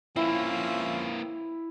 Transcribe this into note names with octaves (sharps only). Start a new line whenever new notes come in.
F3 A#3 C4 C#4 E4 E5